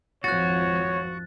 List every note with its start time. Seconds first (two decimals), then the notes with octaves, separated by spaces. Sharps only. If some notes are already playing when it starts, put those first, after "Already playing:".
0.24 G#1 F2 F3 F#4 C#5 F#6 A6